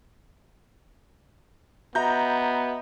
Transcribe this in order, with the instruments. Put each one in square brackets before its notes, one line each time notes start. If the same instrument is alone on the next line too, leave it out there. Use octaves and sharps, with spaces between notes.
[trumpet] B3 [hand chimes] F#4 D#5 E5 [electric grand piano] A#5 G6